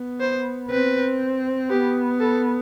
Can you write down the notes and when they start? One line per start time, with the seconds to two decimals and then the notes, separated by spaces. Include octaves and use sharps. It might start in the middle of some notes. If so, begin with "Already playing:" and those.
Already playing: B3
0.21 C5
0.70 C4 B4
1.70 B3 G4
2.20 A4